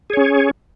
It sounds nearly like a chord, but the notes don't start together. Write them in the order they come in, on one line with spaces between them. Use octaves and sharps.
G#4 C#5 C#4